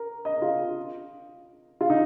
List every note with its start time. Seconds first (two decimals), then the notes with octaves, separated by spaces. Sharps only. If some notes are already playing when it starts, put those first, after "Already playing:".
Already playing: A#4
0.25 D#5
0.42 F4
1.81 F4
1.90 D#4